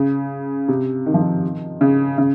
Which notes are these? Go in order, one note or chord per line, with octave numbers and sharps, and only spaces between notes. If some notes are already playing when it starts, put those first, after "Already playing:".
Already playing: C#3
C3
D#3
F3
D#3
C#3
C#3